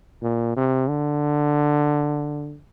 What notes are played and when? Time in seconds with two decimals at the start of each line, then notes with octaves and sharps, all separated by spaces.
0.22 A#2
0.56 C3
0.89 D3